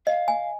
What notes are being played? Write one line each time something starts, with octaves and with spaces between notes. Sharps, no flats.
D#5 F5
G#5